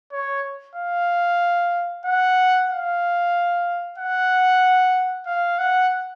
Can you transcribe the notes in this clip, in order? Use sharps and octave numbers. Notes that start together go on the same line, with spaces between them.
C#5
F5
F#5
F5
F#5
F5
F#5